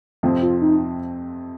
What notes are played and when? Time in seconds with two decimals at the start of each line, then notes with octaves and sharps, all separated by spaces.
0.23 F2 C3 F3 C4
0.42 F4
0.62 D#4